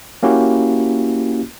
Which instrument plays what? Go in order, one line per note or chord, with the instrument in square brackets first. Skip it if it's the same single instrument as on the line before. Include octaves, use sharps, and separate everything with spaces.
[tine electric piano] A#3 C#4 E4 F#4 G4